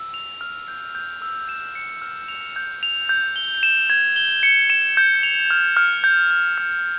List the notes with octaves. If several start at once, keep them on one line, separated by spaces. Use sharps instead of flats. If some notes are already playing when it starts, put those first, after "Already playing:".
Already playing: E6
F7
F6
G6
G6
E6
E7
C#7
F6
F7
G6
F7
G6
G7
E7
G#6
G7
C#7
E7
G6
F7
F6
F6
G6
G6
F6